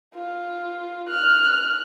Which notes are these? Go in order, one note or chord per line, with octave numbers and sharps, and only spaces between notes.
F4
F6 F#6